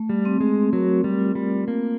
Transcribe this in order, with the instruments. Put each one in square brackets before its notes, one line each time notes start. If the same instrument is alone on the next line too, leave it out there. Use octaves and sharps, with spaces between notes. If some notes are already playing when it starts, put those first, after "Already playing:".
Already playing: [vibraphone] A3
[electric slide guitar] G3
[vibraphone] C4
[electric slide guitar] G#3
[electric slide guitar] F#3 [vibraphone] A#4
[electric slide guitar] G3
[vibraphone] F4
[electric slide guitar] G3
[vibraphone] A3 [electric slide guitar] A#3